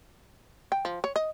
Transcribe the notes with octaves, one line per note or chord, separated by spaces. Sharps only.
G5
F3
C#5
D#5